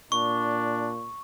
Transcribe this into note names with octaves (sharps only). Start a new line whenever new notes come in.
A#2 D4 C#6